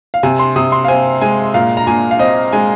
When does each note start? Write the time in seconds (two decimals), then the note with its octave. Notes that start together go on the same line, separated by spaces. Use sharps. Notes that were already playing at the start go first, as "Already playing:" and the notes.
0.14 F5
0.23 C3 G#5
0.39 C6
0.56 C3 D#6
0.72 C6
0.84 F5
0.88 C4 G#5
1.22 G#3 G#5
1.54 A#2 F5
1.77 A#5
1.87 A#2 G#5
2.11 F5
2.19 C4 D#5
2.53 G#3 G#5